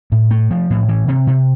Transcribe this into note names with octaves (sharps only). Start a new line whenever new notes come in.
A2
A3
F3
A2
E3
C3
C3